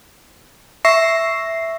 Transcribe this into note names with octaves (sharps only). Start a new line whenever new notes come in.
E5 C#6 E6 A#6 C7